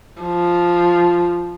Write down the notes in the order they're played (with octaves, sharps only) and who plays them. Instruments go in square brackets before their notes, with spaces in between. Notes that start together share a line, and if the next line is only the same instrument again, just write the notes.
[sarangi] F3